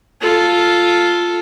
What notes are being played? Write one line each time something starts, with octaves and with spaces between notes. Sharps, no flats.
F4 A4